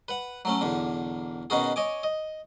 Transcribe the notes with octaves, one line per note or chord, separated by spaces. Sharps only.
B4 F#5
F#3 A3 C#4
B1 E2 D3
B2 D#3 C#4 F#4 G#4
C#5 D#5 G#5 D6
D#5